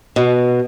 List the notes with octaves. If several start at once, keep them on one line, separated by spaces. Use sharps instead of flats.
B2